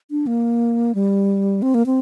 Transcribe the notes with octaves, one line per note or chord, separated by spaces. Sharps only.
D4
A#3
G3
C4
A#3
C4